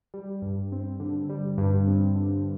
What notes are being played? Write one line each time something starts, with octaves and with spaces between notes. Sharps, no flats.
G3
G2
C4
D3
G3
G2
C4
D3